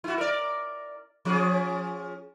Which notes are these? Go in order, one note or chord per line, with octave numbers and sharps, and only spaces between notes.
E4 F#4
A#4 D5
F3 C#4 G#4